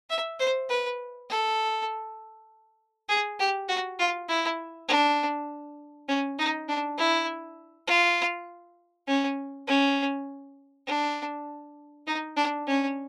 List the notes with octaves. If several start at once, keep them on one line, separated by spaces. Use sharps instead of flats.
E5
C5
B4
A4
G#4
G4
F#4
F4
E4
D4
C#4
D#4
D4
E4
F4
C#4
C#4
D4
D#4
D4
C#4